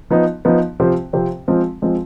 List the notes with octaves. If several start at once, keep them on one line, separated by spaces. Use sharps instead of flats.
F3 B3 D#4
F3 B3 D#4
C3 F3 C4 G4 C5
C3 F3 C4 G4 C5
F3 G#3 C4
F3 G#3 C4